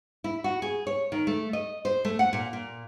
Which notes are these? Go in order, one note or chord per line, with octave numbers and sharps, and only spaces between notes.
E4
F#4
G#4
C#5
D#3
A3
D#5
C5
A3
F#5
A#2
A#2